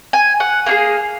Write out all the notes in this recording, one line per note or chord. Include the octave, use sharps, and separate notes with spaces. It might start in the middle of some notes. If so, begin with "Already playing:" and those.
G#5
F#5
A#3 D#4 G#4 F5